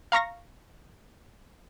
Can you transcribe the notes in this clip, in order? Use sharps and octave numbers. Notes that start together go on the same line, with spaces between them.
F5 A#5 C#6 A#6